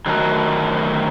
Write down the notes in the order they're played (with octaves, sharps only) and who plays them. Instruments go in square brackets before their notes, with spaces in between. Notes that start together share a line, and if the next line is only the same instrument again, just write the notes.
[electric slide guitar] D3 D#3 F#3 A3 F#4 A#4